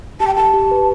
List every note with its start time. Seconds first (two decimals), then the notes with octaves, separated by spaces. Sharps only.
0.20 G4 A5
0.27 G5
0.35 G4 A5
0.53 G4
0.71 B4